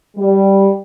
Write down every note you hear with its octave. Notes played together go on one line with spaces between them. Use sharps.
G3